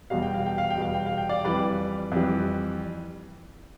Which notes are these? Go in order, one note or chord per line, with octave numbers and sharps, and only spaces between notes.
E2 B2 G3 F5
G5
F5
G5
F5
G5
E2 B2 G3 F5
G5
F5
G5
D5 F5
F2 E3 G3 B4 D5
F2 E3 G3